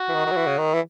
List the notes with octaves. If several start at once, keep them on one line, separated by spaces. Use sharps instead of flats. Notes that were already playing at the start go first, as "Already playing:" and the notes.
Already playing: F#4
E3
D#3
D#3
F#3
E3
C#3
D#3
E3